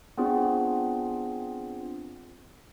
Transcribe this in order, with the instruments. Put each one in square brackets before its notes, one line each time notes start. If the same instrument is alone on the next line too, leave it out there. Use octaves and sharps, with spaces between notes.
[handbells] B3 C4 D4 F4 G#4